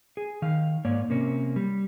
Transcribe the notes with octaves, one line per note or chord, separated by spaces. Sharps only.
G#4
D#3 F5
G#2 A#3 C#5 D5
C3 A#3 C#4
G3